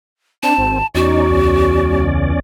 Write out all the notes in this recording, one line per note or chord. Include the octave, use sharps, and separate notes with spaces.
C4 D4 A5
G#1
E2 C#4 D#4 F#4 D5
C#2